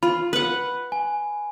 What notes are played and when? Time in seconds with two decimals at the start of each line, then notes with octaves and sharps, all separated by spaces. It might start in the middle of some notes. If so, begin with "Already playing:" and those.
0.03 F4 B5
0.33 B4 F#5
0.92 G#5